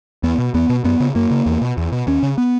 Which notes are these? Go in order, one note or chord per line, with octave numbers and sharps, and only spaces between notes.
E2 B3
B2
E2 B3
B2
F#2 B3
C#3
F#2 A#3
C#3
E2
B2
E2
B2
D#2 C#4
C#3
B3